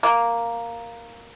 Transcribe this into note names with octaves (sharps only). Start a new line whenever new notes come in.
A#3